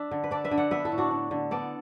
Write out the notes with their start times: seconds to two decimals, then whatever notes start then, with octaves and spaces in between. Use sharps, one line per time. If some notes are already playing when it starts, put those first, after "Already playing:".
Already playing: D4 E5
0.11 D3
0.24 B4
0.31 D4 A4 D5
0.44 B4 E5
0.51 D3
0.58 D5 F#5
0.71 B3 B4 E5
0.85 E4 A4
0.92 A2
0.98 D4 F#4
1.11 D4
1.31 D3
1.51 B3 A4 D5